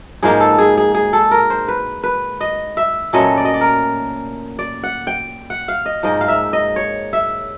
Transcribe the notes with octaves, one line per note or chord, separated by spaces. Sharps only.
G#2 F3 A#3 D#4 G#4
A4
G#4
G#4
G#4
A4
A#4
C5
B4
B4
D#5
E5
A#2 F#3 A3 C#4 D#5
D5
D#5
D5
A#4
D5
F#5
G5
F#5
F5
D#5
G#2 F3 A#3 D#4 D#5
F5
E5
D#5
C#5
E5